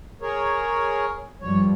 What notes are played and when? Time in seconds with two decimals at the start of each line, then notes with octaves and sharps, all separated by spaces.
0.22 G#4 A#4 C#5
1.41 G2 F3 G3 C#5